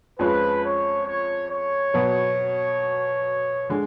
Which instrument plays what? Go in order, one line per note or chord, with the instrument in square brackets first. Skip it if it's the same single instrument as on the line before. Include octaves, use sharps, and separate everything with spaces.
[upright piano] F2 F3 G#3 C#4 [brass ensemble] B4
[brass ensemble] C#5
C#5
C#5
[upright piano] B2 F#3 B3
D3 G#3